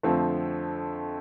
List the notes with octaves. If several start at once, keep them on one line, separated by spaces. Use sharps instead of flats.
F2 D3 F3 A3 C4